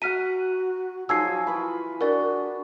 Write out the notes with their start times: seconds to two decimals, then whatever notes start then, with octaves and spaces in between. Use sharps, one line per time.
0.02 F#4 F#5 A#5 F6 B6 D#7
1.09 F3 F#3 D#4 G#4 E6 G#6 C7
1.27 F4
1.47 E3 F4 B5
2.01 D4 F#4 A#4 D5